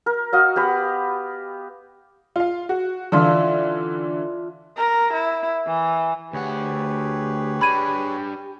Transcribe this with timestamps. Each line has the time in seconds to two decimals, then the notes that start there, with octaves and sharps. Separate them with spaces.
0.06 A#4
0.33 F#4 D#5 F5
0.56 B3 G4 B5
2.36 F4 F5
2.69 F#4
3.12 D3 E3 D4 F4 E5
4.77 A#4
5.13 E4
5.67 E3
6.33 D2 G4 G#4 B4 C#5 F#5
7.61 G3 D4 B5 G#6 D#7